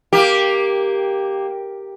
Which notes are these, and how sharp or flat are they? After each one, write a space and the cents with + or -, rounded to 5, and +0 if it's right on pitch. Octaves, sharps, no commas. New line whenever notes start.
A#3 +0 G4 +0